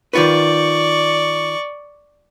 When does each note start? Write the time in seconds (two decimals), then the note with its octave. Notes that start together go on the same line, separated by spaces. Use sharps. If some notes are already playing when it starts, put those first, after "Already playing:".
0.13 D#3 F4 B4 D5 C#6